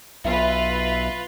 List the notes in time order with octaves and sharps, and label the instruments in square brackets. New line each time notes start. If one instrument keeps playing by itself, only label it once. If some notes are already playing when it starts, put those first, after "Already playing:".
[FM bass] B1 [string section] F4 B4 [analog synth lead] E5